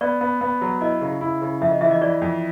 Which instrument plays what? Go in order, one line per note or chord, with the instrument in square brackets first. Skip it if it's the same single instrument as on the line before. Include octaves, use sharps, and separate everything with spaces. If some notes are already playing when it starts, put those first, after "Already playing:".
[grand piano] B3 [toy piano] D5
[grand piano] B3
B3
F#3
[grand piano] E4 [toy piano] D#5
[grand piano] C#3
E4
C#3
[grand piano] F2 [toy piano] E5
[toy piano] D#5
[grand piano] E3 [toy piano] E5
[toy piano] D#5
[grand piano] E3 [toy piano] D5
[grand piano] F2